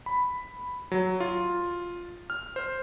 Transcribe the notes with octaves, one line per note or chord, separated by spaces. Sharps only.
B5
F#3
F4
F6
C5